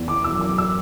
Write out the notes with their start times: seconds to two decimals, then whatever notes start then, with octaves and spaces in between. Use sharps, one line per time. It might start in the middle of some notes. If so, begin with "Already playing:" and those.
Already playing: E2
0.08 E3 D6
0.24 E6
0.30 F#2
0.41 D6
0.52 F#2
0.58 E6